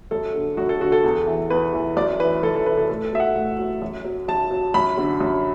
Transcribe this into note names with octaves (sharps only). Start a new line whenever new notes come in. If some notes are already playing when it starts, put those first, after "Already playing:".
F#2 A4
D3 F#3
F#2 F#4
A4
D3 F#3 F#4
A4
E2
E3
E2 B4
E3
F#2 D5
E3 B4
F#2 A4
A4
E3 B4
A4
A2 A4
A4
F#3 E5
F#5
A2
F#3
F#2
F#3
F#2 A5
F#3
F#2 B5
D3 F#3
F#2